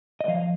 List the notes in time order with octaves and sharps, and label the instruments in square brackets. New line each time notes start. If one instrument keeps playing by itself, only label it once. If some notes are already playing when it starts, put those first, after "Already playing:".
[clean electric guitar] D#5
F3 F5